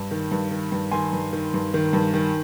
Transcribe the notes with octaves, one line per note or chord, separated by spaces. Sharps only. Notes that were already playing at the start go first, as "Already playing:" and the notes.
Already playing: G2
D#3
G2
D#3
G2
D#3 G#5 C6
G2
D#3
G2
D#3
G2
D#3